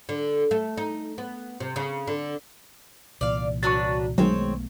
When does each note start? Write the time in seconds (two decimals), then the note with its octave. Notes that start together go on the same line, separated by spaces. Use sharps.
0.09 D3
0.51 A3
0.77 D#4
1.18 B3
1.60 C3
1.76 C#3
2.07 D3
3.21 C2 A#2 E3 D5 F5
3.63 F#3 D4 B4 C#6 A6
4.18 B1 D#3 F#3 G#3 A3 B3 C4 C#5